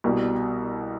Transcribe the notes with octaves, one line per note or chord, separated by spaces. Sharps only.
C2 B2 G3